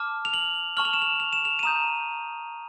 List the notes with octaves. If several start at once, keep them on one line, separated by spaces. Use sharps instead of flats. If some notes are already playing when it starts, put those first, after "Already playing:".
Already playing: A5 D6 F6
F7
F#7
A5 C#6 F6 F#7
F7
E7
F7
F7
E7
F7
D#7
A#5 D#6 G6 E7